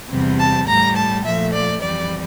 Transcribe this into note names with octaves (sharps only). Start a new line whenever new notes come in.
E2 C3 G3
A5
A2 G3 A#5
A5
A#2 F3 A3 E5
D5
F2 E3 G3 D5